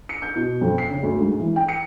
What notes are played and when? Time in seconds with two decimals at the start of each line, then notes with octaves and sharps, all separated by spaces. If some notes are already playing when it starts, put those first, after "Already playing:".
0.09 C#7
0.22 G6
0.36 B2
0.61 F2
0.78 C7
0.90 C#3
1.03 D2
1.21 G#2
1.40 E3
1.56 G5
1.68 C#7